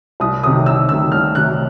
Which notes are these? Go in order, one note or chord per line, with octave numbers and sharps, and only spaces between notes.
C2 D#6
C3 D#3 F#3 A3 D#6
C2 E6
C3 D#3 F#3 A3 E6
C2 F6
C3 D#3 F#3 A3 F#6